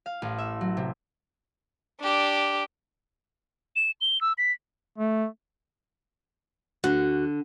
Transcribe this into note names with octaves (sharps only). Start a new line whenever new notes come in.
F5
A1
E5
F#3
C3
D4 G4
E7
G7
E6
B6
A3
D2 D3 F#4 F#6